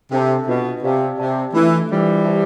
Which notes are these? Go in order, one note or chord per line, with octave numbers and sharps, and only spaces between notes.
C3 D4 A4 E5 A5
B2 D4 F4 B4
C3 G4 D5 F5 A5
C3 G4 D5 A5
E3 A3 D4 F4 A4
E3 G3 D4 F4 C5 E5
G4 C5 E5 A5